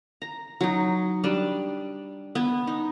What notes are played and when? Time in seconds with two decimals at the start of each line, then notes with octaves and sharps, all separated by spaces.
0.22 A#5
0.61 F#3 D#4
1.24 G3 D4
2.35 B3
2.67 D#4